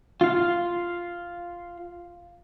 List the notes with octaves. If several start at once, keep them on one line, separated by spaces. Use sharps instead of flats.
F4 F5